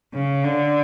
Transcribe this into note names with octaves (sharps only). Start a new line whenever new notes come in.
C#3
D3